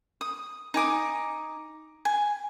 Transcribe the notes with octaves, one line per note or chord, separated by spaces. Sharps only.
D#6
D#4 G#5 D6 D#6
G#5